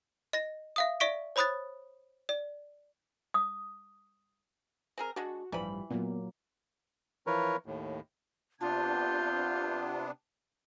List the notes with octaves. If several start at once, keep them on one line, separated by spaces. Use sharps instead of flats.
D#5 A#6
E5 F5 D#6
D5 E5 C#6 B6 D7
C5 C#5 B5 D#6 F#6 A6
D5
D#6
C4 G#4 A#4
G#3 D4 F#4
A1 G2 E3 F3 G3 B5
A#2 F#3 A#3 B3
E3 F3 A#4 B4 C#5
D#2 A2
C3 B3 D4 F4 A5 G6